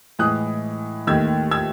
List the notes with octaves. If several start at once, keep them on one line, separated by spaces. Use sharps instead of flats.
A2 E3 G#3 D#6 F#6
D#2 D#3 A3 E6 G#6
E6 G#6